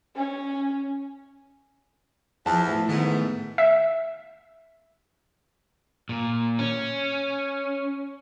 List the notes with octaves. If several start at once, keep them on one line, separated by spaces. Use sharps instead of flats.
C#4
E2 F3 A5
A2
G#2 D#3 A3 B3
E5
A#2
C#4